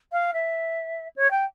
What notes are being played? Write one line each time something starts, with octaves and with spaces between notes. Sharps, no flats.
F5
E5
C#5
G5